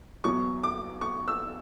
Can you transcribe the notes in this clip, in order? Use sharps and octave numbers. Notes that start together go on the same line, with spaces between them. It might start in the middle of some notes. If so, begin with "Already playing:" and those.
E2 B2 F#3 C#6
D6
C#6
E6